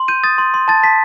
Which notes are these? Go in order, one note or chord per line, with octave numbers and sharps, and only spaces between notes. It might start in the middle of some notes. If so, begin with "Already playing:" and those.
Already playing: C6
G6 D#7
D#6 A6
C6
C6
A5 A6
A5 B6